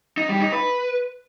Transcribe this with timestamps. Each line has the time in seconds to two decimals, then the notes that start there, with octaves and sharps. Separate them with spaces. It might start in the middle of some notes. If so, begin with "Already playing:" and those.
0.17 D#4
0.29 G3
0.41 D#4
0.52 B4